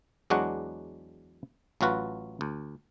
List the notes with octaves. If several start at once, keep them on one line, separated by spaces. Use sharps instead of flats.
E2 F#3 G#3 D4 F#4 F#5
A1 F#3 F4 F#4 B4
D2